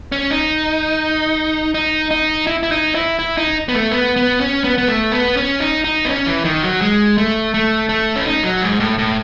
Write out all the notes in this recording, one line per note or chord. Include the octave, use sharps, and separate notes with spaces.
C#4
D#4
D#4
D#4
E4
E4
D#4
E4
E4
D#4
B3
A3
B3
B3
C#4
B3
B3
A3
B3
C#4
D#4
D#4
B3
C#4
E3
D#3
F#3
G#3
A3
A3
A3
C#4
D#4
F#3
G#2
A2
A2